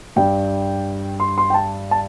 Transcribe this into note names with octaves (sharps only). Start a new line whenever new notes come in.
G2 G3 G5
C6
C6
G5
A5
A5